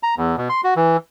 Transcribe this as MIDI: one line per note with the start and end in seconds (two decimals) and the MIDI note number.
0.03 0.15 82
0.17 0.36 40
0.38 0.48 47
0.49 0.61 84
0.64 0.74 66
0.76 0.97 52